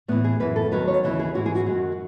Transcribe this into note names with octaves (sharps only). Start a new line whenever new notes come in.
A2 E3 B3
G#4
F#2 E3 B4
A4
D#2 D#3 F#3 B4
C#5
D#2 C#3 E3
G#4
G#2 E3 F#4
G#4
F#4
F#2 D#3 F#3